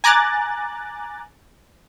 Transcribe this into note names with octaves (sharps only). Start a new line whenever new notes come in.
G#5 A#5 D6 F#6 A6